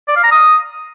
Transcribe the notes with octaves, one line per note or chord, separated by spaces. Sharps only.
D5
F5
A#5
D#6